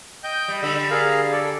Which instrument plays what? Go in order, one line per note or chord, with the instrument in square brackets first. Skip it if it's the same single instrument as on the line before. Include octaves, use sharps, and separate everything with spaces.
[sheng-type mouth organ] D#5 G5 G6
[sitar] G3
[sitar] D3 G3 [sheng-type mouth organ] B5 E6
[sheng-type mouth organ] G#4 A#4 F5
A4 D5